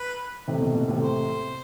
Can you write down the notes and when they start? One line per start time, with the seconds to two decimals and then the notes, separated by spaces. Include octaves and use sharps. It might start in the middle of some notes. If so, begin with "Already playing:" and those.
Already playing: B4
0.48 A2 C3
0.62 B2
0.75 B2
0.88 A2 C3
1.02 C5